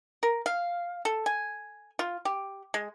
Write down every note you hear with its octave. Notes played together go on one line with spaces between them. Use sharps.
A#4
F5
A4
G#5
F4
G4
G#3